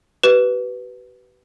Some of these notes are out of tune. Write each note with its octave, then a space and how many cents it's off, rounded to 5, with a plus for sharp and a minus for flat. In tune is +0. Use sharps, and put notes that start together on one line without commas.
G4 -45 B4 +0